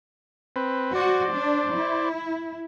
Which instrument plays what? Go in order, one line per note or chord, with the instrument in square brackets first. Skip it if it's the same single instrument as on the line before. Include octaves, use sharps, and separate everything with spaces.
[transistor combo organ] C4 B4
[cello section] F#4 [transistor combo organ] C5 D5
[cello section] D4
E4